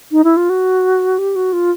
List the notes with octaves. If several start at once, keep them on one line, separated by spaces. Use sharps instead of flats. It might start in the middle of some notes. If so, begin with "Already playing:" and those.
D#4
E4
F4
F#4
G4
F#4
F4